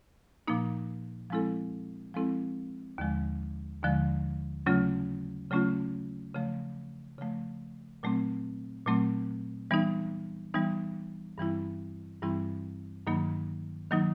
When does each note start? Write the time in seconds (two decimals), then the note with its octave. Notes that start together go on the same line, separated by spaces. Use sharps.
0.47 A#2 F3 A#3 D#4
1.30 F3 G#3 C4 E4 A4
2.14 F3 G#3 C4 E4 A4
2.98 D#2 D3 F3 G#3
3.82 D#2 D3 F3 G#3
4.66 C#3 F#3 A3 C#4 F4
5.50 C#3 F#3 A3 C#4 F4
6.35 C#3 F3 A3
7.18 C#3 F3 A3
8.03 A#2 F#3 A3 C4
8.86 A#2 F#3 A3 C4
9.71 E3 G3 B3 D#4
10.54 E3 G3 B3 D#4
11.38 G2 E3 G3 C4 E4
12.22 G2 E3 G3 C4 E4
13.07 G2 D#3 F#3 A#3 D#4
13.91 D#3 F#3 A#3 D#4